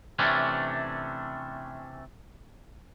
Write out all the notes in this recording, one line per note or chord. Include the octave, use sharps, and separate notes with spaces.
C3 E3 A3 C#4 D4